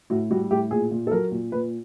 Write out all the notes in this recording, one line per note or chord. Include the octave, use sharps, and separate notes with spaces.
A2 F#4
G3 F#4
A2 G4
A#2 G#4
A#2
A4
F#3 A#4
A#2
A#2 B4